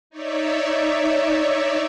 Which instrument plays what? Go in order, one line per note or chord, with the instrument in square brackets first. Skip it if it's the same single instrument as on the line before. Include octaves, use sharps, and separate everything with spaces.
[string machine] D#4 C#5 D5 E5